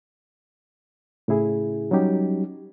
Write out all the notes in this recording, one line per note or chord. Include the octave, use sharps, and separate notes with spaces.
A2 C#3 E4 G#4
F#3 G3 C#4 D#4 G4